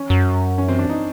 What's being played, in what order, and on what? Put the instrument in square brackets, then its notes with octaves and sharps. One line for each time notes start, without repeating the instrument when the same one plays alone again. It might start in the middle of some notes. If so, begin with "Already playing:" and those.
Already playing: [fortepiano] C#4
[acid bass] F#2
[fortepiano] C#4
C4
D4
D#4